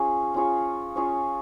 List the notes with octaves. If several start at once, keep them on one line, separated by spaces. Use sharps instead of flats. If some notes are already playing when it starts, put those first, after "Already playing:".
Already playing: C#4 F4 G#4 C#5
C#4 F4 G#4 C#5
C#4 F4 G#4 C#5